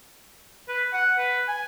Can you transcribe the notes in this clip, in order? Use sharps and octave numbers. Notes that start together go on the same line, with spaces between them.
B4
F#5
B4
G#5